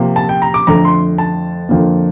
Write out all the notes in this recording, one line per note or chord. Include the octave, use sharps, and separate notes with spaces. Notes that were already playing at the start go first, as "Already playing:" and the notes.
Already playing: C3 F3 A#3
A5
G5
A#5
D6
F2 D3 A3 A#5
C6
A5
F2 D3 F3 A#3